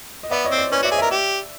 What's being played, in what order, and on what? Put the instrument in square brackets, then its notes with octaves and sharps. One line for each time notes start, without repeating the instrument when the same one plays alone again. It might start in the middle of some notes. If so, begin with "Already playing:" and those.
[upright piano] D#5
[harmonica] B3 [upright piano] D5 E5
[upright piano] C#5 D#5
[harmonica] C4
[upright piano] C5 D5
[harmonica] C#4 [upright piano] B4 C#5
[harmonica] F#4 [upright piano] D5 E5
[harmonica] G#4 [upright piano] D#5
[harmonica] A#4 [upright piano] D5 E5
[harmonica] G4